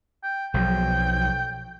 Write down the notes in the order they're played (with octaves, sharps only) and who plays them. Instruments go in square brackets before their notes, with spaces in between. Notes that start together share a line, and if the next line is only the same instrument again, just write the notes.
[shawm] G5
[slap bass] B1 F3 F#3 [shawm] G5